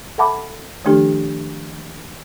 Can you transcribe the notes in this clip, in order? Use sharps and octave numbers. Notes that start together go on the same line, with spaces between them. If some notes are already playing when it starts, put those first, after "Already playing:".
A4 E5 F#5 A5 B5 D6
D#3 F3 A3 D4 G4 A4